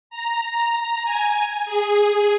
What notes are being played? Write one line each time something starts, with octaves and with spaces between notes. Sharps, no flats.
A#5
G#5
G#4